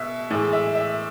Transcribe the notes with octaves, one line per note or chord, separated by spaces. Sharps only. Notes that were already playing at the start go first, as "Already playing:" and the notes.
Already playing: B2 E5
A2 E3 G#3
E5
E5